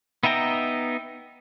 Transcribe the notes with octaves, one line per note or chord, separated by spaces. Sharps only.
B3 D#4 E5 G5 A#5